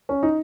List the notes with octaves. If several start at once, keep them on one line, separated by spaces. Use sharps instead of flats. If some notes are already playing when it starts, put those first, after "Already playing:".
C#4
D#4